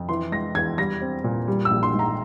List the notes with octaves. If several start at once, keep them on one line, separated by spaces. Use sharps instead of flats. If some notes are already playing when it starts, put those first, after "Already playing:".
Already playing: F2
E3 C6
G#3 A#6
E2 G#6
G3 A#6
C4
A#2
G3
E6
A#1
C6
G#2
A#5